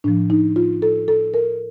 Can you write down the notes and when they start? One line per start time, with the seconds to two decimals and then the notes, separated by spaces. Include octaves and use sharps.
0.04 A2 F3 D4
0.30 D#4
0.56 F4
0.82 A4
1.08 A4
1.34 A#4